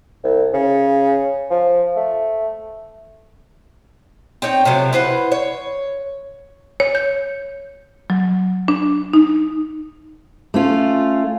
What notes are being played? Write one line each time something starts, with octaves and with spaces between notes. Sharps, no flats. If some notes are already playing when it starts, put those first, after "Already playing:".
C2
C#3
F3
A3
C4 D#4 C#5 G5
C3 F3 F#3 A3
E4 B4 C5 F#5
C#5
C#5
G6
F#3
D4
D#4
A3 C#4 F4